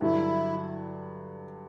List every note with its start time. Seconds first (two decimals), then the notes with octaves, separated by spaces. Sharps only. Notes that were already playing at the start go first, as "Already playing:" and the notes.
0.01 G2 D3 F#3 E4